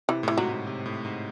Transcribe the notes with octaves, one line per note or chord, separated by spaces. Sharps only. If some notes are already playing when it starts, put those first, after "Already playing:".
C3 E3
A2 E3
G#2 F#3
A2
C3
A2
G#2